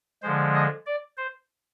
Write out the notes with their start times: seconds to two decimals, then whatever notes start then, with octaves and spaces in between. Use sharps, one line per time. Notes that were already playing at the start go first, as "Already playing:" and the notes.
0.23 D3 F3 G#3 C5
0.54 D#5
0.86 D5
1.18 C5